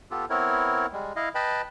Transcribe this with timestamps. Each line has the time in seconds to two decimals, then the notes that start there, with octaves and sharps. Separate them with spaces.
0.11 B3 F4 G4 A4
0.30 B3 C4 E4 A#4 C#5
0.92 G3 G#3
1.16 E4 D#5 F5
1.35 B4 D#5 G5 A5 B5